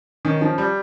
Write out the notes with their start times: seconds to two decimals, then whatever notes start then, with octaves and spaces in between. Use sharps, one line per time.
0.25 D#3 C#4
0.41 F3 C#4
0.58 G3